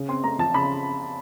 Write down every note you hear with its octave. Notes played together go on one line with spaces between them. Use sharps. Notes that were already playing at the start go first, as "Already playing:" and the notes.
Already playing: C#3
C4 C6
A3 A#5
F3 A5
C#3 B5